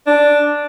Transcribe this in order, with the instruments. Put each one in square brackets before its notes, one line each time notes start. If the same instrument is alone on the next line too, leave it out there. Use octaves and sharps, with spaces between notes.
[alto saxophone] D4